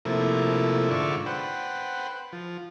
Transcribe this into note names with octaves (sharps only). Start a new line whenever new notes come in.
C3 F3 A3 A#3 E4
G#2 D3 F4 D5 E5 C#6
B4 C5 F#5 G5
F3